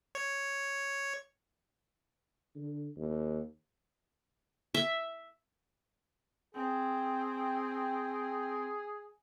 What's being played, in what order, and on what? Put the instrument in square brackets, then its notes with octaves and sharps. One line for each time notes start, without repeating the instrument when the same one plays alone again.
[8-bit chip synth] C#5
[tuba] D3
D#2
[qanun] E5
[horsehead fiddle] C4 G5 [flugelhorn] G#4